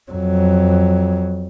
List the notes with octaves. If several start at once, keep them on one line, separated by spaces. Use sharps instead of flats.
F2 F#3